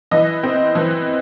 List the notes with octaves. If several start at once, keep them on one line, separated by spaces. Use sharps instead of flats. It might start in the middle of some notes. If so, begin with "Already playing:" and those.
E3 D#5
C4
E3